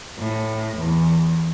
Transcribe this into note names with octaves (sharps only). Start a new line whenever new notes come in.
A2
E2